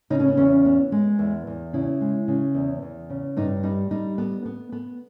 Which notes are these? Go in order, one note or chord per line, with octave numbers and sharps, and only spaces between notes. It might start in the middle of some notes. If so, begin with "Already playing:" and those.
C#3 D#4
C#4
B3
E2 C#4
B3
G#3
E2
E2
C#3 E4
G#3
C#3
E2
E2
C#3
G2 D#4
G3 D#4
G3 D#4
B3
B3
B3